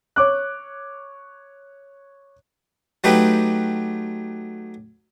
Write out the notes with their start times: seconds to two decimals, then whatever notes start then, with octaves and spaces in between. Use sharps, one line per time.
0.16 C#5 D6 F#6
3.04 F#3 A3 D#4 G4 B4